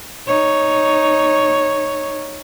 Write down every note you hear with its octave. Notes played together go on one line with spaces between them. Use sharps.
D#4 C#5